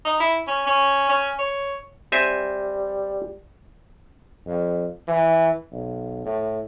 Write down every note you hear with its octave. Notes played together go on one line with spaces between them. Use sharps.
D#4
E4
C#4
C#4
C#4
C#5
G3 C4 E5 G#5
F2
E3
B1
A2